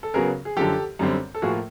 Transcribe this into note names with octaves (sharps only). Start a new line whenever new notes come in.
A4
C#3 F#3 B3 G#4 A#4
G#4
F#2 D3 F3 G4 A4
F#2 D3 G3 C4
A4
A2 F3 A#3 F#4 G#4